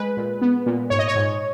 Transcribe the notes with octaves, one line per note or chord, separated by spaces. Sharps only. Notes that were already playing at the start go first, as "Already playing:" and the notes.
Already playing: G#3 B4
A#2
B3
A#2
G#2 C#5
D#5
C#5
G#2